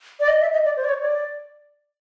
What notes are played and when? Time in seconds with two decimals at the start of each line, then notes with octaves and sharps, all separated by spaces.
0.20 D5
0.28 D#5
0.41 E5
0.53 D#5
0.65 D5
0.77 C5
0.84 D5
0.89 C#5
1.01 D5